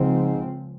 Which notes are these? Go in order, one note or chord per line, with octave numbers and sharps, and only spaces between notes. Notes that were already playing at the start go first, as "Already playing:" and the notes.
Already playing: C#2 G#2 C#3 F3 C4